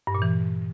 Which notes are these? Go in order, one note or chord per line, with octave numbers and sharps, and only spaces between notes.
G2
A#2
E3